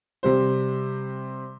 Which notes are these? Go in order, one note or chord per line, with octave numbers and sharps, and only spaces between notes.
C3 G3 C5